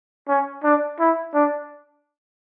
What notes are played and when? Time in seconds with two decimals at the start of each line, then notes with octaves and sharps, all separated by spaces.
0.29 C#4
0.64 D4
1.00 E4
1.34 D4